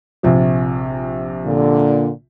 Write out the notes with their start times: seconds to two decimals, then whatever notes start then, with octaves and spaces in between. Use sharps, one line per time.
0.23 A#1 C3 F3
1.46 A#2 D3